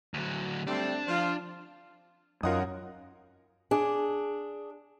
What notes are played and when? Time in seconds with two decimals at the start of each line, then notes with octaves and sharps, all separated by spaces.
0.14 D2 F#3
0.67 G3 A3 C4 D4
1.08 F3 F4
2.43 F#2 D#4 F4 A#4 F#5 D#6
3.71 D4 G#4